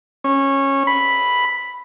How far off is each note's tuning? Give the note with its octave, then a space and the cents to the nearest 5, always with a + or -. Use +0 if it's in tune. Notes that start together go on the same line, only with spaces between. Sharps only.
C#4 -15
B5 +0